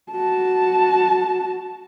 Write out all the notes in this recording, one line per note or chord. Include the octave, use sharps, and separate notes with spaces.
F#4 A5